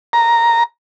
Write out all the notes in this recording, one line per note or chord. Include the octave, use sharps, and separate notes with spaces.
A#5